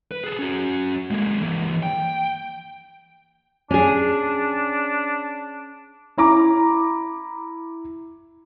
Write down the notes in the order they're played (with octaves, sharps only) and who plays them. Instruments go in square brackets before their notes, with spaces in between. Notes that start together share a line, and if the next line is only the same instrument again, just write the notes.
[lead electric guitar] B4
G#4 A4
C#4 F#4
G#3 A#3
E3 A#3
G5
[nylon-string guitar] C#4 G#4 [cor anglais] D4
[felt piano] E4 A#5 D6